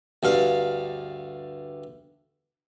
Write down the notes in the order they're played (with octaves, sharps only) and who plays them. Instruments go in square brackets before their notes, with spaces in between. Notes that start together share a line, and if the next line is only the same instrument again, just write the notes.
[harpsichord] D2 G2 F5